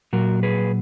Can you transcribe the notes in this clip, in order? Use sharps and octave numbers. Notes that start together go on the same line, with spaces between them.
A#2 F#3 F#4 A#4
G#4 B4